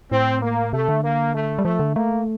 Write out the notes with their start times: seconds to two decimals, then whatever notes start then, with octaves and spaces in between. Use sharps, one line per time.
0.12 A2 C4
0.42 A#3
0.73 C3 A3
0.89 D3
1.03 A#3
1.34 A3
1.59 G3
1.65 F3 A3
1.80 D3
1.96 A3 A#3